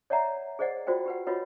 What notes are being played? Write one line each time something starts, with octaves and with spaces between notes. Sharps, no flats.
C#5 D5 E5 F#5 A#5
G#4 C5 D5 D#5 F#5
F4 F#4 C5 D5 G5
G4 B4 F#5
F4 F#4 B4 C#5 D#5 F#5